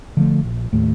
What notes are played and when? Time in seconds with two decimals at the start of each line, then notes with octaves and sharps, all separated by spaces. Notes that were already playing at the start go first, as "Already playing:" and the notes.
0.17 D3 F3 A3
0.44 A#1
0.73 D#2 A2 A3